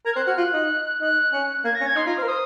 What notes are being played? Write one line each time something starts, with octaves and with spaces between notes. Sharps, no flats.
A#4 G#6
F6
C5 F#6
F#4 F6
F4 F#6
D#4
D#4 F#6
C#4
A#3 G#6
A#6
C#4
G#6
D#4 C6
F4 A#5
C5 F6
A#4
C5 D#6